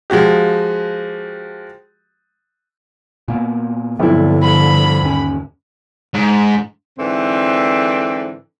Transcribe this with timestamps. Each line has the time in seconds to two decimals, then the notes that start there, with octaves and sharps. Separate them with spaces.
0.10 F3 G#3 F#4 G4
3.28 A#2 A#3 B3
3.99 B1 G2 D3 F3 G3 C4 E4
4.43 F3 B5
5.03 D#2 C#4
6.14 G#2
6.98 G#2 D3 E3 C4